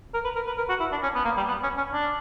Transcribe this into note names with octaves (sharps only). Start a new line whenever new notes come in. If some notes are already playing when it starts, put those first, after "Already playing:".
A#4
B4
A#4
B4
A#4
F#4
E4
D4
C#4
B3
A#3
G3
B3
C#4
C#4
D4